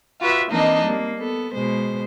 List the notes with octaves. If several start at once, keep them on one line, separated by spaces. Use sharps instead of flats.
F4 F#4 B4 E5
E3 A#3 C4 D4 D#4 D#5
G3 A#3 C4
B3 A4
B2 G#3 C5